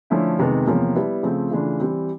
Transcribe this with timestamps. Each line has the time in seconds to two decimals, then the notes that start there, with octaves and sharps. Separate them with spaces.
0.10 D3 F3 A3 C#4 E4
0.38 F2 C3 D#3 G#3 B3
0.67 E2 C3 F3 A#3 C#4
0.95 G3 B3 E4
1.23 C#3 F3 A3 C4
1.51 C#3 E3 A3 D4 F4
1.80 E3 G3 C4